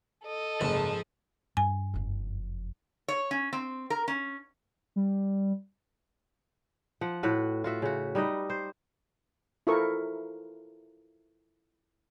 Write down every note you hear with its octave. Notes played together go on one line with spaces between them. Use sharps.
A4 D#5
F#1 G#2 F3 A5
G2 G#5
F#1 F2
C#5
C#4
C4
A#4
C#4
G3
F3 F#5
A2 F#4 B4
F4 F#4 E5
C#3 F#4
G3 D#4 B4 D#5
C5
E4 F4 A4 A#4 C5 C#6